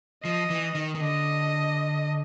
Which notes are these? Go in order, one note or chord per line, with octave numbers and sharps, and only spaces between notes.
F3 D#5
E3
D#3
D#3
D3 D#5